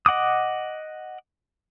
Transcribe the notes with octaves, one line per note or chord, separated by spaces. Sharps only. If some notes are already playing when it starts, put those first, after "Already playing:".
D#5 F#5 D6 D#6